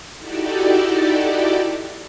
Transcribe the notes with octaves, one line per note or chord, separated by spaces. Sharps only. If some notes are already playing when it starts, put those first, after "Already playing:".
D#4 E4 F#4 G4 A4 D5